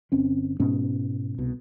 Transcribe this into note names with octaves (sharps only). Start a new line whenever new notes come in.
G1 C4 C#4
G#2 B2 B3 C#4
C2 B2